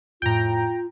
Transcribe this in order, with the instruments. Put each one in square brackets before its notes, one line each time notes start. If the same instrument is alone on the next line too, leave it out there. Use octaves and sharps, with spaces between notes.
[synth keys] F2 A2 [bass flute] F4 [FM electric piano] G5 A#5